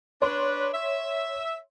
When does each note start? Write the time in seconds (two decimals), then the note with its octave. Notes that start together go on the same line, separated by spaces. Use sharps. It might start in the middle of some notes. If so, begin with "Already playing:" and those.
0.22 D4 B4 C#5 C6
0.74 E5